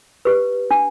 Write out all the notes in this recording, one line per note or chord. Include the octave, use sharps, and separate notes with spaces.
G4 B4
D4